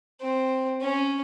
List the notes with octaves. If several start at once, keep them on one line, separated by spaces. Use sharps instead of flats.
C4
C#4